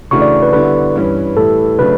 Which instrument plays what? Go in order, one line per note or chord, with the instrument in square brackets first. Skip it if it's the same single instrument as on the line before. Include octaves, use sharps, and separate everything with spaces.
[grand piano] C#3 E3 A3 D4 F#4 [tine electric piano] C#6
[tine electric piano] D5
B4
[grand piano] D3 G3 B3 E4 [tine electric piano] B4
[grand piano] G2 E3 G3 C#4
[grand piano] A2 E3 G3 [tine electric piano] A4
[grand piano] C#3 F#3 A3 D4 [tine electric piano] B4